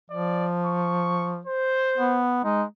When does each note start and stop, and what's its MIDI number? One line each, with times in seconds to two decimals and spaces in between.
0.10 1.42 53
0.10 0.46 74
0.65 1.33 85
1.45 2.21 72
1.97 2.43 59
2.44 2.64 56
2.44 2.63 63